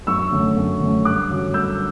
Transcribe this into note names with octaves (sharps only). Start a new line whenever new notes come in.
F#2 C#6 E6
D3 A3 C#4
F#2
D3 A3 C#4
G2 D6 F#6
D3 F#3 C#4
G2 E6 G6